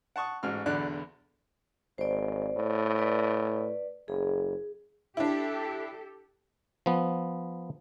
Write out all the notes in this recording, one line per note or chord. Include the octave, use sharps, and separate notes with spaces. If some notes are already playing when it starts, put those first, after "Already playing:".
F#5 A5 C#6 D#6
A1 G#2 F#4 F6
B1 E2 D3 D5 F#6
G#1 C5 D5
A2
B4 D5
F#1 G#4
D4 E4 G4 A4
F3 B3